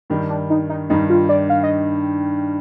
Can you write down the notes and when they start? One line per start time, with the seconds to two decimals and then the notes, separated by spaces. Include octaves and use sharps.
0.10 G2 D#3 G3
0.30 D4
0.50 D#4
0.69 D#4
0.89 G2 D#3 G3 D#4
1.10 F4
1.29 D5
1.50 F5
1.63 D#5